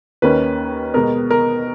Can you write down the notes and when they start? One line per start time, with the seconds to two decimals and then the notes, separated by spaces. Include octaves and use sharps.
0.22 D#2 D#3 A#3 C#4 B4
0.94 B2 G#3 B3 A#4
1.31 A#4